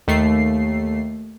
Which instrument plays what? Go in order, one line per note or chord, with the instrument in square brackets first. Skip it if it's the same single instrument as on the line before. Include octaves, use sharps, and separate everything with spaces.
[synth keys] D#2 A3 C7